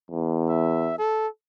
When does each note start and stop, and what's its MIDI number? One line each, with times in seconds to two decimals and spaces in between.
0.11 0.95 40
0.49 0.99 76
0.99 1.28 69